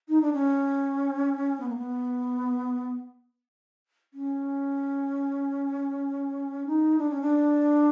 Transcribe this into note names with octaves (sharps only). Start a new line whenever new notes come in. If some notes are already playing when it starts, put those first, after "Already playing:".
D#4
D4
C#4
B3
A#3
B3
C#4
D#4
D4
C#4
D4